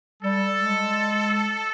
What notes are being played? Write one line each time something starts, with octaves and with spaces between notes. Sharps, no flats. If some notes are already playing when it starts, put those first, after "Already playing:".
G3 A4
G#3